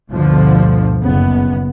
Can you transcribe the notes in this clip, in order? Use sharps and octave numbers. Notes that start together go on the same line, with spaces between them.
D2 G2 B2 D3 F3
F#1 B3